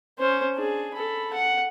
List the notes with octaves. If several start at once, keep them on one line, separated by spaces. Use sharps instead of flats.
C#4 C5
D4 G#4
A4 B5
F#5